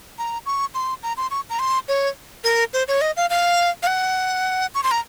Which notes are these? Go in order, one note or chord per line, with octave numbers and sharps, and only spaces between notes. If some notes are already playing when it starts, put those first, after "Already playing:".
A#5
C#6
C6
A#5
C6
C#6
A#5
C6
C#5
A#4
C5
C#5
D#5
F5
F5
F5
F#5
C#6
C6
A#5